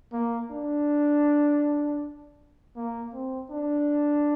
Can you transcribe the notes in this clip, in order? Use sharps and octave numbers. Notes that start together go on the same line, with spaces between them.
A#3
D4
A#3
C4
D4